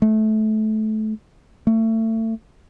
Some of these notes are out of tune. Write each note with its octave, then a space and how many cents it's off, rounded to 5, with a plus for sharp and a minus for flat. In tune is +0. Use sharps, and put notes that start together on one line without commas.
A3 -20
A3 +30